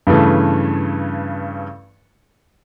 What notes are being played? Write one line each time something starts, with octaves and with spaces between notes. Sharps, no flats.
G2 C#3 E3 A3